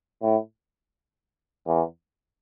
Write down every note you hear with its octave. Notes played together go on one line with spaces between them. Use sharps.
A2
E2